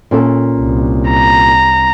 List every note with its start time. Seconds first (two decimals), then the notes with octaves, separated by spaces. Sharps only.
0.11 A#2 C#4 A4
0.59 C2
1.10 A#5